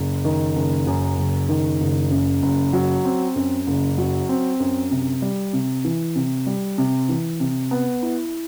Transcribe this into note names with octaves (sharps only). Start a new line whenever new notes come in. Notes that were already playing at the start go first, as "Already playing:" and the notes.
Already playing: F#1
D#3
F#1
F#2
F#1
D#3
F#1
F#2
F#1
F#3
C4
F#2
F#1
F#3
C4
F#2
C3
G3
C3
E3
C3
G3
C3
E3
C3
B3
E4